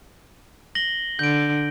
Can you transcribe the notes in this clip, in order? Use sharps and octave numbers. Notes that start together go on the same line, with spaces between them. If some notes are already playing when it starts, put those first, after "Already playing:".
A#6 F#7 G7
D3 G6 D7